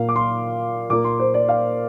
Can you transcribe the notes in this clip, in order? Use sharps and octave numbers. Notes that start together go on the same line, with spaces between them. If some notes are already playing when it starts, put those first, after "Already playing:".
Already playing: A#2 A#3 F5
D6
C6
A#2 A#3 D6
C6
C5
D5
F5